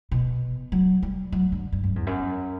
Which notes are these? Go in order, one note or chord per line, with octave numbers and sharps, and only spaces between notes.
B2
F#3
G3
F#3
D3
G2
F#2
E2
F#2